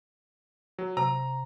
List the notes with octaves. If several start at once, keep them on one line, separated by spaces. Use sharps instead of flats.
F#3
C3 A#5